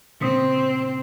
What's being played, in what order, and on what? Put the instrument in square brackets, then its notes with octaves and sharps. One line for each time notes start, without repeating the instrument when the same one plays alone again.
[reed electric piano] A#2 C#3 D#6 [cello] C4